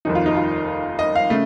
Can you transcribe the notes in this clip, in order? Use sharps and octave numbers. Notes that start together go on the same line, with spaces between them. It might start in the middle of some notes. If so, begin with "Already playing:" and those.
F1 D#2 D#3 D#4
F4
D#4
F4
D#5
F5
C#3 A3